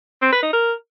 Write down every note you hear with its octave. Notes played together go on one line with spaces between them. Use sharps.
C4
B4
D#4
A#4